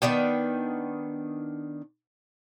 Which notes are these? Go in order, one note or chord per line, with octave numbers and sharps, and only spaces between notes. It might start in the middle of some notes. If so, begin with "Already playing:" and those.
D#3 B3 D4 G5